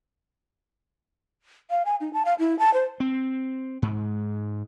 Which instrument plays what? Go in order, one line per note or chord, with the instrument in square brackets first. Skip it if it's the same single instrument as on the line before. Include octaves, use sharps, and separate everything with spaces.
[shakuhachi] F5
G#5
D#4
A5
F5
E4
A5
C5
[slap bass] C4
G#2